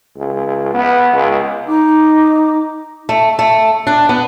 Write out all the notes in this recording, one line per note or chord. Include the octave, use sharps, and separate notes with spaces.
C#2
B3
C#2
D#4 D6
A3
A3
D4
B3